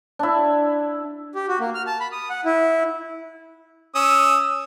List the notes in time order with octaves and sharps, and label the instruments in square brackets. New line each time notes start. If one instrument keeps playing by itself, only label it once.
[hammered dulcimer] D4 E4
[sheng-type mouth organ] G4
F#4
A#3
F6
A5
B5
D#6
F#5
E4
[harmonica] C#4 D#6 E6